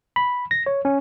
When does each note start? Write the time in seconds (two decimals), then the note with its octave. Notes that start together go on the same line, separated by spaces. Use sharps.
0.16 B5
0.51 A#6
0.66 C#5
0.85 C#4